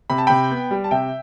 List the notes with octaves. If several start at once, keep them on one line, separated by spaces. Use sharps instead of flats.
C3 B5
A5
C3 G5 B5
B3
G3
A5
C3 E5 G5